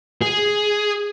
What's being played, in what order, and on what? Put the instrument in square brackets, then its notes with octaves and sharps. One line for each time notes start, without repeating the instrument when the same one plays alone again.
[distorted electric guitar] G#4